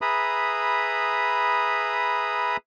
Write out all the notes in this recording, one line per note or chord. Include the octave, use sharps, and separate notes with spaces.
G#4 B4 E5 A#5 B5 D#6